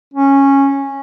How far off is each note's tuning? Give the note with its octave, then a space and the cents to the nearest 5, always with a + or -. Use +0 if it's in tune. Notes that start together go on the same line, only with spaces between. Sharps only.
C#4 -10